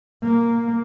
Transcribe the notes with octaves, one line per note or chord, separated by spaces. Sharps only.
A#3